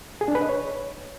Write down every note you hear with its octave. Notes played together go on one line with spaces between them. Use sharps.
G#4
D4
B4
D#5
C#5